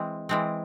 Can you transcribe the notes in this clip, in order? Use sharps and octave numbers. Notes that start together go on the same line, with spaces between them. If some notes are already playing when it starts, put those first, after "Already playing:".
Already playing: E3 G#3 C4
E3 G#3 C4